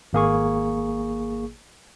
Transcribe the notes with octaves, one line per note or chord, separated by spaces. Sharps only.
G#1 A#3 G#4 C#6